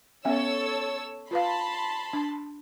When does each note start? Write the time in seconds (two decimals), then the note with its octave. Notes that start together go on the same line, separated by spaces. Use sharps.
0.25 B3 C#4 A4 C#5 E5 E6
1.31 F4 B4 F5 A5 B5 C6
2.13 D4